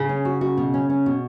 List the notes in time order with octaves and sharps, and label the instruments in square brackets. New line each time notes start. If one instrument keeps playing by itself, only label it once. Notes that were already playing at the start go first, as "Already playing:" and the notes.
Already playing: [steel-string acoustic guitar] C#3
[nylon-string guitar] C#4
F#4
F#4
B2
C#4
C#4
B2